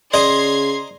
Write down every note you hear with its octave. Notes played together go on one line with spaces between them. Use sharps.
C#3 C5 D5 D#5 A#5 C6 G#6 C7